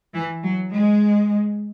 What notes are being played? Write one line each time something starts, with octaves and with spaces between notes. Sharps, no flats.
E3
F#3
G#3